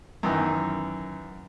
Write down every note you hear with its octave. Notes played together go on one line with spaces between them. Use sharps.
F#2 D#3 E3